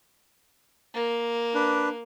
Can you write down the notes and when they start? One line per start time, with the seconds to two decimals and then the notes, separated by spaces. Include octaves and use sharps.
0.94 A#3
1.55 D4 B4